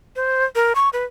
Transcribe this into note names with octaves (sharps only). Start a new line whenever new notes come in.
C5
A#4
C#6
B4